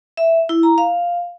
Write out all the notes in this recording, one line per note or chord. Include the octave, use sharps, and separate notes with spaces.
E5
E4
A#5
F5